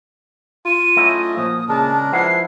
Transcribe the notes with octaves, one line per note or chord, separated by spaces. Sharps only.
F4 D#7
F#3 A3 C#4 E4 D#5
A#2 F3 D#6
C#3 G#3 D4 A#4 A5
F3 E4 B4 F#5 C7